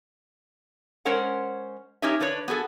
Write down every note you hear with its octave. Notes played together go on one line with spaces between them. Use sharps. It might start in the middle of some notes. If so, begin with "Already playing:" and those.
G#3 C#4 A#4 C5 C#5 F#5
C#4 D#4 G4 C#5 D#5 E5
D3 D4 B4 C#5
B3 F#4 G#4 A4